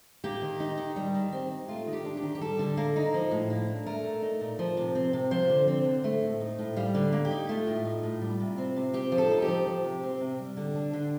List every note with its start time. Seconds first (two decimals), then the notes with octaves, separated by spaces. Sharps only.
0.24 A#3 G4
0.42 D#3
0.60 D#4
0.78 D#3
0.96 G3
1.14 D#3
1.32 C4
1.51 D#4
1.68 A3 F4
1.87 D#3
1.93 G4
2.05 D4
2.17 G4
2.23 D#3
2.35 G4
2.41 G3 A4
2.59 D3
2.77 A#3
2.96 D#4
3.14 F3
3.31 A2
3.50 A#3
3.68 D4
3.86 A3 A#4
4.04 A#2
4.22 D#4
4.41 A#2
4.59 F3
4.77 C3
4.95 C4
5.13 C3
5.31 F3 C5
5.50 D3
5.68 C4
5.85 D3
6.04 A3
6.22 A2
6.40 D#4
6.59 A2
6.76 G3 F5
6.94 D3
7.13 A#3
7.25 G4
7.31 D#4
7.49 A3 F4
7.67 A2
7.85 D#4
8.03 A2
8.22 G3
8.39 C3
8.58 C4
8.76 C3
8.94 C4 G4
9.12 F3
9.18 A4
9.30 D#4
9.42 G4
9.48 F3
9.67 F3
9.84 C3
10.03 C4
10.21 C3
10.39 G3
10.57 D3
10.75 D4
10.93 D3